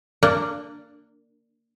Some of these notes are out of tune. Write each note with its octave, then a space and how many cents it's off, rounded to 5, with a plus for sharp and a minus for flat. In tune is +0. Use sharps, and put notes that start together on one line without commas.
A#3 -15 D4 +0